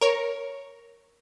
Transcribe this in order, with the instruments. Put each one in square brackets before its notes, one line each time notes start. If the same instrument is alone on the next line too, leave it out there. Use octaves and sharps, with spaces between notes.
[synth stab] A#4 C#5